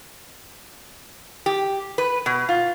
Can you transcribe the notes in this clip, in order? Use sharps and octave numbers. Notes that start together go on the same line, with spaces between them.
G4
B4
B2
F4